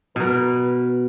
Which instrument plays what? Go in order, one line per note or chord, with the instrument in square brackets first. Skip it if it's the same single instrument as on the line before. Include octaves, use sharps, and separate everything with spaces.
[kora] B2 A#4 [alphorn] B4